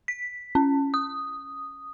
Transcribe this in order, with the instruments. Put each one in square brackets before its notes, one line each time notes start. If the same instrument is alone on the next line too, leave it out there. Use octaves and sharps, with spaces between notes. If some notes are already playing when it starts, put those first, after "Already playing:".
[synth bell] B6
C#4
D#6